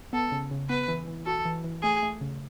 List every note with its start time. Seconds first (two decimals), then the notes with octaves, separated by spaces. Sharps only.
0.13 B3 A4
0.32 C#3
0.51 C#3
0.70 B3 B4
0.88 E3
1.08 E3
1.26 F#4 A4
1.45 E3
1.64 E3
1.83 A3 G#4
2.02 A3
2.21 C#3